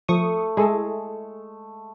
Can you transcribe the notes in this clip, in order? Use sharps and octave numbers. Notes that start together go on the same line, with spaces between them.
F3 A3 C#6 D#6
G#3 E4 G#4 A4